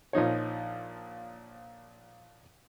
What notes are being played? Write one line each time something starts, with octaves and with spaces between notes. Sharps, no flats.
A#1 F3 D#4 C#5